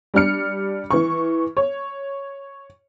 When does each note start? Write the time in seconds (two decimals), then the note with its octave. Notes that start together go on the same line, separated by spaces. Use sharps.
0.14 G3 D4 F6 C#7
0.91 E3 C#6
1.57 C#5